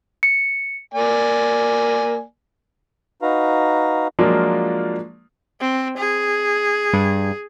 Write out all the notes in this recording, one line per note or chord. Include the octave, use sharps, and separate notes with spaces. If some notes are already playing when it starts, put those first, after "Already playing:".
C#7
A#3 D5 G#5
D#4 F#4 B4 F5 A#5
F3 F#3 G#3 A#3 D4 F4
C4
G#4
G2